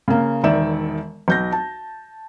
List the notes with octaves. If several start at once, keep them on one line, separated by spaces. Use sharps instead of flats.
C#3 A#3
E1 D#3 D5 E5 E7
B1 G6 A#6
A5